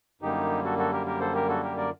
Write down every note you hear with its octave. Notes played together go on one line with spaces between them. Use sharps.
F#2 D3 G3 A#3 D#4 G4
F#4 A4
F#4 A4
G4 A#4
G4 A#4
A4 C5
G4 A#4
F#4 A4
G4 A#4
A#4 D5